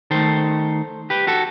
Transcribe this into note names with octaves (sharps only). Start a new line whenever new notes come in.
D#3 A3 A4 C5
G4 B4
F#4 A4